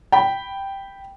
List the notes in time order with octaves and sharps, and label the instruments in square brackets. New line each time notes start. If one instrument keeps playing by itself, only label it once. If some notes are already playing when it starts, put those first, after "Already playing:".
[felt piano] G5 B5